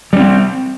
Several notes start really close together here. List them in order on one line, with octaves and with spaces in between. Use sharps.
G3 C#4 C4